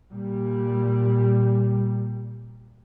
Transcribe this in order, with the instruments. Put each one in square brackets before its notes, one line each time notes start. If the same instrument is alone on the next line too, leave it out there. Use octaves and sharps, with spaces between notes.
[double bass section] A#2 G3